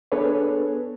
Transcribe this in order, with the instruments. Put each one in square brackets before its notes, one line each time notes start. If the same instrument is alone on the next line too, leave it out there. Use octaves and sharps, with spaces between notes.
[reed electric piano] B3 D4 G#4 A4 B4 C#5